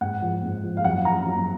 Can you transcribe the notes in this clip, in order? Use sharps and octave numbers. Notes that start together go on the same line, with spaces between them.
G#2 F#5
F3
G#2
F3
F5
F#2 F#5
F3 A#5
F#2